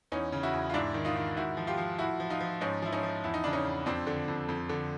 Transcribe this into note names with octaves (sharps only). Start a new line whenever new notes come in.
E2 C#4 D#4
C#3
E4 F#4
E2
F4
G#2 D4 E4
D#3
D#4 F4
D#3
G#2 E4 F#4
F3
F4 G4
F3
A2 E4 F#4
F3
D#4 F4
F3
G#2 C#4 D#4
F3 E4
C#4 D#4
F3
E2 E4
D#4
C#3 D4
C#4 D#4
E2
F2 C4 D4
D3
F2
F2
D3